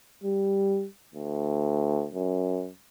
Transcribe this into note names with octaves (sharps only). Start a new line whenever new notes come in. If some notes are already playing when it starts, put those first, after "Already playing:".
G3
D2
F#2